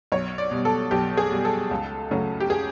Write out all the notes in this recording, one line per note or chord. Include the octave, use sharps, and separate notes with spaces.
B1 C#5
D5
B2 G3
A4
B1 G4
G#4
B2 G3
A4
C#2
C#3 F#3 A3 C#4
G4
G#4